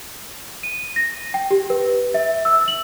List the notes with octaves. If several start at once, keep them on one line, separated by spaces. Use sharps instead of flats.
D#7
A#6
G5
G4
B4
E5
E6
F#7